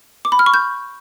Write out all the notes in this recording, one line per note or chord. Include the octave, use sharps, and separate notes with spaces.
D6
B5
F6
C#6
G6